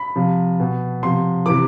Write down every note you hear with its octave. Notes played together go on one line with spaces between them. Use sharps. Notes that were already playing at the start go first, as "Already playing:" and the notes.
Already playing: B5
C3 F3
B2
C3 F3 C6
C3 E3 D6